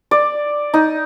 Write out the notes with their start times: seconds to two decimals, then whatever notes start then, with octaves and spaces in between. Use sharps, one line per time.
0.11 D5
0.74 D#4